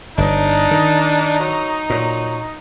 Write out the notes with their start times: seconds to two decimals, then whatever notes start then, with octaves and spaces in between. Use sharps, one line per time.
0.18 G1 D4 D#4
0.71 D#3
1.40 F#3
1.90 A#2 F#3